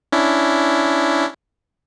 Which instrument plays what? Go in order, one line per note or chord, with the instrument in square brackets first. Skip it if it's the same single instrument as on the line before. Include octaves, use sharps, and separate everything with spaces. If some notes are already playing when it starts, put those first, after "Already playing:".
[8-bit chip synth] C#4 D4 E4